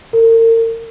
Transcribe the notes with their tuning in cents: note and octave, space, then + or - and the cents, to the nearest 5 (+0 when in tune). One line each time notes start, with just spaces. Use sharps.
A#4 -40